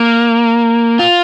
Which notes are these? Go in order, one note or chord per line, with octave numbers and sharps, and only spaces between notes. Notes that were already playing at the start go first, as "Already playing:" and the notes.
Already playing: A#3
F4